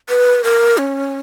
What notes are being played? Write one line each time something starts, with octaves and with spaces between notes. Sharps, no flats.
B4
A#4
C#4